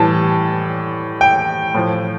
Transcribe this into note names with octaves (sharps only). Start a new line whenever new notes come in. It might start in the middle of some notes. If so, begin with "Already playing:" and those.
Already playing: A2 E3 G3 A5
G5
A2 F3